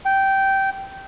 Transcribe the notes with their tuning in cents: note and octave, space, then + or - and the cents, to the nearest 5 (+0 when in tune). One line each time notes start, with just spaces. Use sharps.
G5 -15